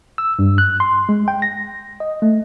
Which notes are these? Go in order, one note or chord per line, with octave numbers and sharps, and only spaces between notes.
E6
G2
F#6
C6
G#3
G5
A#6
D#5
A3